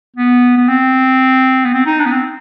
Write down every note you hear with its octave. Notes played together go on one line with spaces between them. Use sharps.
B3
B3
C4
B3
C4
D#4
D4
B3
C4